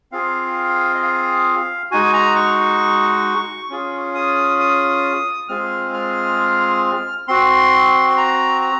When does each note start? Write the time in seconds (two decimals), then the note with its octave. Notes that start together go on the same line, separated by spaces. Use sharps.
0.12 C4 F4 G#4 F5
0.95 D#5
1.02 F5
1.91 G#3 D#4 F#4 G#5
2.14 A#5
2.36 C#6
3.70 C#4 F4 G#4
4.15 D#6
4.59 D#6
5.48 G#3 C4 F4 G#4 F6
5.94 F6
7.28 C4 F#4 C6
8.09 C6
8.17 A#5
8.62 A#5